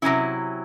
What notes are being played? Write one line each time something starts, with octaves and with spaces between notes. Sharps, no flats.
C3 F#3 C#4 E4